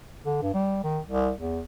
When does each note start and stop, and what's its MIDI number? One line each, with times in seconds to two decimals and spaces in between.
0.25 0.39 50
0.42 0.52 43
0.54 0.79 55
0.84 0.99 51
1.08 1.31 36
1.39 1.61 40